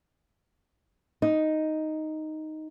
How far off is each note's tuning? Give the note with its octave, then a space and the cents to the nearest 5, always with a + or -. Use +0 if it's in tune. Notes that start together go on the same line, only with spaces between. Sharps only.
D#4 +0